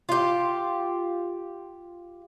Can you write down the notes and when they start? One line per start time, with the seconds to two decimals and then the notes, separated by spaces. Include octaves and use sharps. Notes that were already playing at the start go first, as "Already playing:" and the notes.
0.09 F4 G4